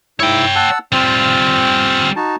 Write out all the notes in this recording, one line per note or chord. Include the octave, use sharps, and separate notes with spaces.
G#2 E4 C#5 G5 E6
F#5 A5 E6
G3 C4 F4 F6
D#4 F#4 A5